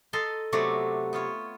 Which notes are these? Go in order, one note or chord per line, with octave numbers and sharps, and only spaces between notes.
A4 D#5 A5 A#5 C6
C3 F#3 A3 B3 F#4 D5
B3 F4 C#5